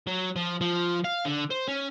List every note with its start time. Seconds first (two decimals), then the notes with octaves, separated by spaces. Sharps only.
0.07 F#3
0.36 F3
0.61 F3
1.04 F5
1.25 D3
1.51 C5
1.68 C#4